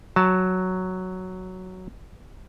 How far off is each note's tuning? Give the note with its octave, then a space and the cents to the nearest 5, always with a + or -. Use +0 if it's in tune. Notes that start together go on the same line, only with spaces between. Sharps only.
F#3 +0 A5 +5